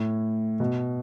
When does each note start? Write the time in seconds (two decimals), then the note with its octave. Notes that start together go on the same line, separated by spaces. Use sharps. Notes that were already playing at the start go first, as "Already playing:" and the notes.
Already playing: A2
0.60 B2